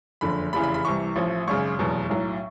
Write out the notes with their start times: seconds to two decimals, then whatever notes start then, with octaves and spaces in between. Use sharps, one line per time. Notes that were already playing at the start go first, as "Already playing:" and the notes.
0.21 F#1 F2 D3 B5
0.53 F1 E2 C#3 E3 B5
0.63 B5
0.74 B5
0.85 C2 C3 E3 C#6
1.16 A1 A2 F3
1.47 G#1 F#2 C#3 C#6
1.79 F1 E2 B2 F#3
2.10 B1 A2 F#3